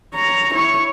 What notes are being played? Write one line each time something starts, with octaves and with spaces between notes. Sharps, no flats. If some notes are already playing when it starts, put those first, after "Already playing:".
C#5 A#5
E4 C#5